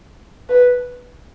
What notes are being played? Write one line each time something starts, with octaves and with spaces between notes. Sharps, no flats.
B4